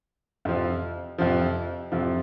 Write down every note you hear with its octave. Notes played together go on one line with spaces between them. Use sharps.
F2 C3 F3
F2 C3 F3
F2 C3 F3